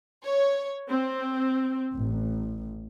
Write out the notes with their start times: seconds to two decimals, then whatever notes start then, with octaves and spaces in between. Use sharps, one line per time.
0.24 C#5
0.88 C4
1.95 A1